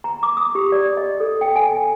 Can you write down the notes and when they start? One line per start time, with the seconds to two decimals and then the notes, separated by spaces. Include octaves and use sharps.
0.04 A#5
0.23 D6
0.37 D#6
0.55 G4
0.72 D5
0.97 D#5
1.20 A4
1.41 G5
1.56 G#5